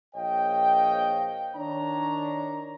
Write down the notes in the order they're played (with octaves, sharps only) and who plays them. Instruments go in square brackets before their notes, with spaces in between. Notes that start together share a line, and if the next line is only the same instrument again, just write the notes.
[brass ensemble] A#1 C#5 D#5 F5 G5
D#3 D4 C#5 A#5